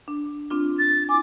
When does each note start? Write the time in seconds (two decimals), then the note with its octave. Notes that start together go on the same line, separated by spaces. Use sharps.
0.08 D4
0.50 C4 D4 F4
0.79 A6
1.09 E4 G#5 D6